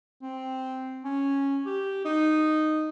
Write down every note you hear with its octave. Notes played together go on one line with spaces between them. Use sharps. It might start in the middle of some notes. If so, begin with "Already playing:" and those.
C4
C#4
G4
D#4